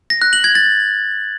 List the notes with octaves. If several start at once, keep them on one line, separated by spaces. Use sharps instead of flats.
A#6
F#6
F#7
G#6
A6